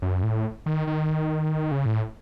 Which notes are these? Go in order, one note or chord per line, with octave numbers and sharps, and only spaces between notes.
F#2
A2
D#3
D#3
C#3
A2